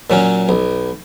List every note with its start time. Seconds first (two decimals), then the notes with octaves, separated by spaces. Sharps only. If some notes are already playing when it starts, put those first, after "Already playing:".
0.10 A#2 F#3 C#4
0.49 B1